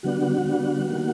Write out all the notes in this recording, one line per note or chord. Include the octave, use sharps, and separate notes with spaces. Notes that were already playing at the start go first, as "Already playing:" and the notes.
D3 G3 B3 D4 F#4 F#5
D3 G3 B3 D4
D#3 G3 A#3